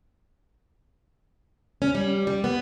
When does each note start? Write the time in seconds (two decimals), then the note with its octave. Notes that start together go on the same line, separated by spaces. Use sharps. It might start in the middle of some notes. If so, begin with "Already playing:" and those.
1.82 C#4
1.95 G3
2.27 G3
2.44 B3